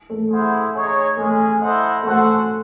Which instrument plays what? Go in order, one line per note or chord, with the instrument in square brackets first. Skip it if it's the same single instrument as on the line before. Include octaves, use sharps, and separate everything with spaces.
[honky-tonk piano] A3
[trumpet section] E4 G#4 C5 F#5
D#4 G#4 C#5
[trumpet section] G#3 C#4 G#4 [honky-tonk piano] A3
[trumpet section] E4 A4 C5 D#5 F#5
[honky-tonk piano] A3 [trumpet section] C#4 F#4 A4 C5 F#5